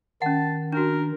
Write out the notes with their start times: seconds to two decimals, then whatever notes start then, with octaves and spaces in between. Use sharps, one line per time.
0.22 D#3 C#4 F#5 A5
0.73 D4 F#4 A#4